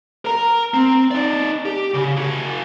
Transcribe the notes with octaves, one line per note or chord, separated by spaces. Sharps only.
A#4 A#5
C4
D#4 D5
G4
C#3
F#4 G#4